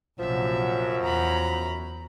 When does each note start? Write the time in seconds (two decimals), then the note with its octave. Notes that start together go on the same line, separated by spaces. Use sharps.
0.19 A#1 F#2 C3 F3 F#3 E5
1.02 E2 A#5 B5